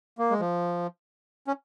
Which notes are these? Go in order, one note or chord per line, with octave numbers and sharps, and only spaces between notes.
A#3
G#3
F3
C#4